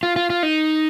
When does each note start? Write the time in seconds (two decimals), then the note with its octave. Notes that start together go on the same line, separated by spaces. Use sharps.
0.03 F4
0.16 F4
0.30 F4
0.43 D#4